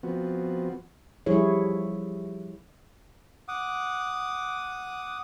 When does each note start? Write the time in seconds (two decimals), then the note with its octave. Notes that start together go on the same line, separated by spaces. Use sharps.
0.03 F3 B3 C4 F#4
1.26 F3 G3 E4 G#4 C#5
3.48 F#5 D6 D#6